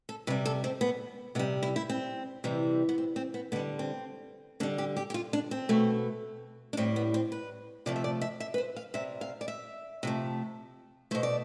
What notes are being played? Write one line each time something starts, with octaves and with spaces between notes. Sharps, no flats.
A4
C3 G3 B4
A4
C4
B3
C3 G3 B3
E4
E4
C4
C3 E3 G3
B3
C4
C4
B3
D3 G3 B3
C4
D3 G3 D4
G4
G4
G4
F4
D4
C4
B2 A3
D4
A2 G3 C4
B3
C4
B4
C3 F3 A3 D5
E5
D5
E5
E5
B4
C5
F5
C3 G3 E5
F5
D5
E5
C3 F3 A3
B2 A3 C5
D5